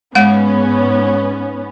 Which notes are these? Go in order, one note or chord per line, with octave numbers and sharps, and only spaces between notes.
G#2 G#3 B3 C#4 F#5